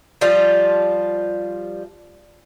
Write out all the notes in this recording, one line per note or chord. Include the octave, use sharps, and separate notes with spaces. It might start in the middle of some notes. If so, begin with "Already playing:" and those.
F3 G3 F4